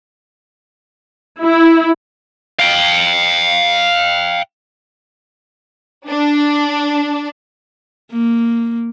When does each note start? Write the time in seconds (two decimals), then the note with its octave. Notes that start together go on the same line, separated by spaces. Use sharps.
1.40 E4
2.60 F5 G5
6.08 D4
8.12 A#3